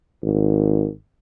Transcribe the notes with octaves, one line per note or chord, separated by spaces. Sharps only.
G#1